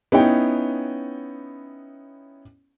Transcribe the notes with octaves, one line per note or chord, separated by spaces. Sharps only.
B3 C#4 D#4 E4 C#5 G5